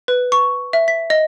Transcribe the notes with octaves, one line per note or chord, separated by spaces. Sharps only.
B4
C#6
E5
B6
D#5